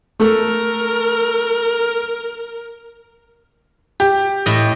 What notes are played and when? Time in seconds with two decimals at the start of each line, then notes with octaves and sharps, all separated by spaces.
0.20 A3 A4 A#4
4.00 G4
4.46 A2 D#5